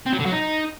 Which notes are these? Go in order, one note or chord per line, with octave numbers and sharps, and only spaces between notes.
C4
F#3
D3
F#3
D#4